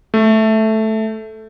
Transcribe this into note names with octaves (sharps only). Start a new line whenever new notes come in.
A3